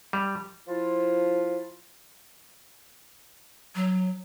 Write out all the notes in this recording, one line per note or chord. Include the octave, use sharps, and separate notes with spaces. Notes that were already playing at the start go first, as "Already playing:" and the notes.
G3
F3 E4 F4
F#3